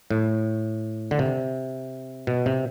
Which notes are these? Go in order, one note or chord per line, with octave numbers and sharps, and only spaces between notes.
A2
D3
C3
B2
C3